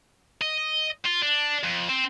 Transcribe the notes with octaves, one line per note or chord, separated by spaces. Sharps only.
D#5
F4
D4
F2
C4